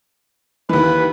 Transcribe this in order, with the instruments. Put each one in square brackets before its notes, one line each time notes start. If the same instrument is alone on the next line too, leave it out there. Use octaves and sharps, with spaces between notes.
[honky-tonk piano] D#2 E3 [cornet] B4